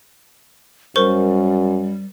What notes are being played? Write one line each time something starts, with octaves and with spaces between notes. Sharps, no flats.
F#2 G3 A#4 C5 C#6